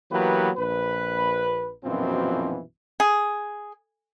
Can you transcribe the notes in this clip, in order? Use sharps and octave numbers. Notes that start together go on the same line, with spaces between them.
E3 F#3 A#3 B3 G4 B4
A#1 B4
A#1 F#2 B2 E3 F3 C4
G#4